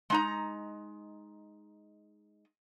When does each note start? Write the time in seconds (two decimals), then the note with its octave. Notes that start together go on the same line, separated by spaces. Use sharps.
0.10 G#3 D#4 A#5